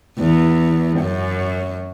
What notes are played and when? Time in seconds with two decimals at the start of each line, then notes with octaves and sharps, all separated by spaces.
0.18 E2
1.00 F#2